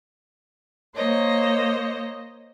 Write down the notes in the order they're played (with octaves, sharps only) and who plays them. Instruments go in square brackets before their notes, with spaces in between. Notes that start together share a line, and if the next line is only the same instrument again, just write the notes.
[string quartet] A#3 C5 C#5 D#5